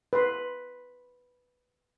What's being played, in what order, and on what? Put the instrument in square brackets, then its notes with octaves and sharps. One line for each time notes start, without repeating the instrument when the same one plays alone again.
[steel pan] B4 C6